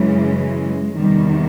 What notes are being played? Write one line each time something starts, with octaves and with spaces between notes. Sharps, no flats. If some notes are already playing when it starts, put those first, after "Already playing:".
Already playing: F#2 C#3 E3 G#3
E2 C3 D#3 G3